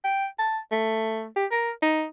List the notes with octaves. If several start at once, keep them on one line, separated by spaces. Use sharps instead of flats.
G5
A5
A3
G4
A#4
D#4